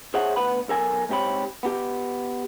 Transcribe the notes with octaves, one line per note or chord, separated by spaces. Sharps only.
G#4 C5 C#5 E5 F#5
D2 B3 B4 F#5 B5
B1 A4 A#4 G#5
G#2 C4 G4 C#5 B5
B3 G4